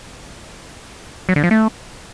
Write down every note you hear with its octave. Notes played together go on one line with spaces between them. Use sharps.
F#3
D3
F3
A3